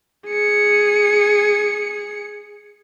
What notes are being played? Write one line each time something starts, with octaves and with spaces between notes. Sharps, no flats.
G#4 C#7